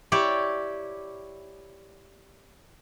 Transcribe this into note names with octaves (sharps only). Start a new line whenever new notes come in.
E4 G4 C#5 D5